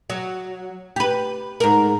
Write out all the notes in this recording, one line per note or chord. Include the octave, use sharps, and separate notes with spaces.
F#3
G4 B4
G#2 A#4